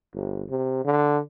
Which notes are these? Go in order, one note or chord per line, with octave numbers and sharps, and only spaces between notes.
G1
C3
D3